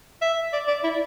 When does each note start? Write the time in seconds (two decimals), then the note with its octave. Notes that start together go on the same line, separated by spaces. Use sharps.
0.22 E5
0.53 D5
0.68 D5
0.84 E4